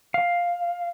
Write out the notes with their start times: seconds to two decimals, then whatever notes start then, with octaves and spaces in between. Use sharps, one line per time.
0.14 F5